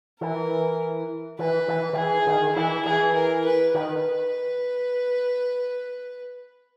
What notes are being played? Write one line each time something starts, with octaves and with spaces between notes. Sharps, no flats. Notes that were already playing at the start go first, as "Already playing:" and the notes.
E3 A#4
E3 B4
E3
D#3
E3 G#4
D#3
E3 E4
E3 G#4
A#4
B4
D#3 B4